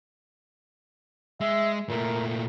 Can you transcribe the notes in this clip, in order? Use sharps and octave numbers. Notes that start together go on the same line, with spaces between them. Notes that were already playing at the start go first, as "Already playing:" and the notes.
G#3 E5
A#2 A3 A#4